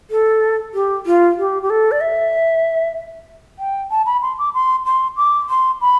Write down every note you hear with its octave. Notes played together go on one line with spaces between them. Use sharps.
A4
G4
F4
G4
G4
A4
D5
E5
G5
A5
B5
C6
D6
C6
C6
D6
C6
B5